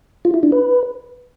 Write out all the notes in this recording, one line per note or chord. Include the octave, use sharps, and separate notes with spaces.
F4
E4
D4
B4